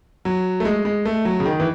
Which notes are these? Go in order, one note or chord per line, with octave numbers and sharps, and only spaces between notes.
F#3
A3
G#3
G#3
A3
F#3
C#3
D#3
E3